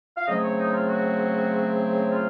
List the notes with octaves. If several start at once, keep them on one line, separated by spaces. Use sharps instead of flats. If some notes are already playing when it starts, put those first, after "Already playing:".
F5
C#3 F#3 A3 C4 D#5
C#5
D#4
F4
F#4
F4